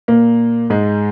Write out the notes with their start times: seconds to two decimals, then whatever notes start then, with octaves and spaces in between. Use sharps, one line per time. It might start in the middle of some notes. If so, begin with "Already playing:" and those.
0.08 A#2 A#3
0.70 G#2 G#3